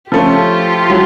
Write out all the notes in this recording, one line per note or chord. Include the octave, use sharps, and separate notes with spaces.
F3 A3 C#4 F4 G4
F#3